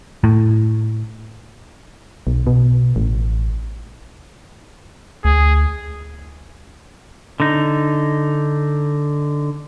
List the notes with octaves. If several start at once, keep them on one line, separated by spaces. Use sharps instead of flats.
A2
B1
B2
A1
D2 G#4
D3 D#4